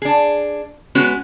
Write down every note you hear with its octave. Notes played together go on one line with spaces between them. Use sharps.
D4 G#4
G#3 B3 C#4 F#4